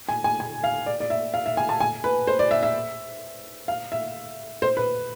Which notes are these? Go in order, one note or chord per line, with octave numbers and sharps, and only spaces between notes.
G#5
G#5
G#5
F5
D5
D5
E5
F5
E5
G#5
A5
G#5
B4
C5
D5
E5
E5
F5
E5
C5
B4